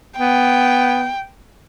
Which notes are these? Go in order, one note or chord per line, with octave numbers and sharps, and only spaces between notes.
B3 G5